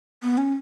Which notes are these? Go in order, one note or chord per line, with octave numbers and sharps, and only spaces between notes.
B3
C#4